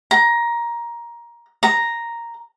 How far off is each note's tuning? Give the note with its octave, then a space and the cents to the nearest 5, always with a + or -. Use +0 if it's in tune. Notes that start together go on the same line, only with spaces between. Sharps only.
A#5 +15
A#5 +0